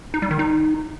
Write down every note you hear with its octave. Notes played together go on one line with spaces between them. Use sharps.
D#4
G3
D#3
D#4